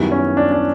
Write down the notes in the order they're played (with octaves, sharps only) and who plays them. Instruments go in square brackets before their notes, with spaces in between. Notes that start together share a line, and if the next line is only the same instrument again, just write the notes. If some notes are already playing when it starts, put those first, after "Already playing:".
Already playing: [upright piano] F#2 D#3 G3 B3 E4
[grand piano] C#4
D4
D4